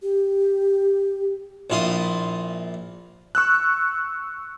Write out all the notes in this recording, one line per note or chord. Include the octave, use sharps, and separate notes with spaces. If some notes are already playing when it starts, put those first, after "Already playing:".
G4
A#1 A#2 E4 F4 C6 D#6
C#6 E6 F#6